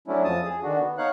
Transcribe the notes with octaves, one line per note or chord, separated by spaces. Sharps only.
F#3 A3 C#4 D4 E4
F2 F3 A5 D#6
G#4
D3 D#3 D4 F#4
B3
D#4 C#5 F5 F#5 F#6